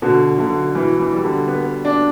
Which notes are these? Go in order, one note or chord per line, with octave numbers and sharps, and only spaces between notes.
B2 D3
B1 D3
B2 E3
E3
G3
D3
B3
D4